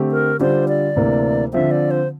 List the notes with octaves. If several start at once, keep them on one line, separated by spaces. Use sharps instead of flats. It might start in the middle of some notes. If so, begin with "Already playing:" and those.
Already playing: D3 A3 C4 G4
A#4
D3 G3 D4 F4 C5
D5
D2 C3 E3 A#3
D3 F3 C4 E5
D5
C5